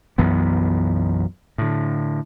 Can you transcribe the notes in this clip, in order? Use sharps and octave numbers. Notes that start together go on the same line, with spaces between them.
B1 F#2 E3 B3
A2 D3